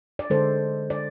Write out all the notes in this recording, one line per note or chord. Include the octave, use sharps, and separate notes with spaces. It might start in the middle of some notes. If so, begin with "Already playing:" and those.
D5
D3 G#3 A4 C5
D5